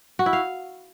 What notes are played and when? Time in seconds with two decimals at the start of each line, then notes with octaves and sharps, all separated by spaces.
0.19 F#4
0.26 E4
0.33 F5